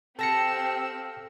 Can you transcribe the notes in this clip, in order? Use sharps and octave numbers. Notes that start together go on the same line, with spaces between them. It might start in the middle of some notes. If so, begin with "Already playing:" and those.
C4 G4 A4 F5 A5 E6 A#6 C#7